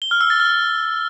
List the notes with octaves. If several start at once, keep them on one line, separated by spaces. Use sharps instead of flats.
G7
F6
E6
A6
F6